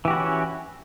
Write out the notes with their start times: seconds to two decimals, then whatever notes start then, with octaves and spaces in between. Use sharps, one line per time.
0.05 E3
0.08 G4
0.10 F#4
0.13 E4
0.16 C#4